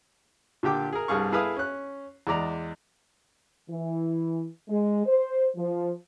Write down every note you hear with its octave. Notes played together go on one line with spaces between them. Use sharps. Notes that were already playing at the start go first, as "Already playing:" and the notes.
A#2 D3 G4 G5 D6
G#4 A#4
C2 G2 G3 G#4 F5 C#6
E4 G#4 A4 B4 F5 D#6
C#4 F#6
E2 G#3 D5 A#5
E3
G#3
C5
F3